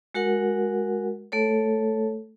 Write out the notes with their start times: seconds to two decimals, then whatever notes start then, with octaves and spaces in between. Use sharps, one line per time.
0.14 G#3 F#4 A#4 F#5
1.32 A3 A4 C#5